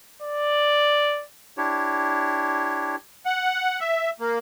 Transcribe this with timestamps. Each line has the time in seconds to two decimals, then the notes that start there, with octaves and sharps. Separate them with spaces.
0.22 D5
1.57 D4 E4 G4 C#5
3.26 F#5
3.80 E5
4.20 A#3